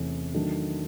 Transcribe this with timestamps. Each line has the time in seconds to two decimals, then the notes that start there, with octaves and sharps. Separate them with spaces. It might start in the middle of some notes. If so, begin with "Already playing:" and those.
Already playing: E2 C3 E3 A3 C#4
0.34 D#3 F#3 A3 D4